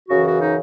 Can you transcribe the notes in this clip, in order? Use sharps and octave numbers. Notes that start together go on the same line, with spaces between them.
F#2 C#3 E3 F#4
F#4
D#4